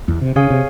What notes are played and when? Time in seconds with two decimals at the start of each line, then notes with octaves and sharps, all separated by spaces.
0.08 E2
0.21 C3
0.36 C#3 G#4 C#5 F5 G#5
0.50 C3